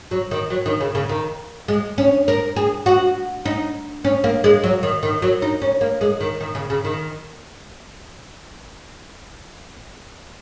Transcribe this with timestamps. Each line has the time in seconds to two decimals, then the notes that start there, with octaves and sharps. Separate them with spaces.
0.11 F#3
0.31 D#3
0.50 F#3
0.66 D#3
0.81 C#3
0.95 C#3
1.09 D#3
1.68 G#3
1.98 C#4
2.28 A#4
2.56 G#4
2.86 F#4
3.46 D#4
4.05 C#4
4.24 A#3
4.44 G#3
4.64 F#3
4.83 D#3
5.03 D#3
5.22 F#3
5.42 D#4
5.62 C#4
5.81 A#3
6.01 G#3
6.21 D#3
6.41 D#3
6.55 C#3
6.70 C#3
6.85 D#3